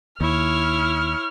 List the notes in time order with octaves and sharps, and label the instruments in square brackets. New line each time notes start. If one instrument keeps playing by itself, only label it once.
[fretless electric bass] D#2 [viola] E4 C#5 [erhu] F6